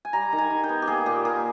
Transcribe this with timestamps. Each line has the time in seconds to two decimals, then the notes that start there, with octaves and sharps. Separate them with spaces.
0.05 G#5
0.13 G3 A#5
0.33 D#3
0.38 G#5
0.50 D#3
0.64 G5
0.69 B3
0.82 G4
0.87 A#3 G#4
1.06 A#2 G4
1.25 A#3 G#4